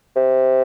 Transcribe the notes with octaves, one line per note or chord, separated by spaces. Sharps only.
C3